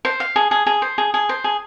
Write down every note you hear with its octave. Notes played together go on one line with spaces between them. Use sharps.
C5
F5
G#4
G#4
G#4
C5
G#4
G#4
C5
G#4